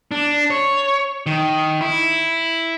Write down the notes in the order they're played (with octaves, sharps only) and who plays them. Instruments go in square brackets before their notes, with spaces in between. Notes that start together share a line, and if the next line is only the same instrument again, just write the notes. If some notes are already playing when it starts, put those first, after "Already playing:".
[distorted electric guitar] D4
C#5
D#3
E4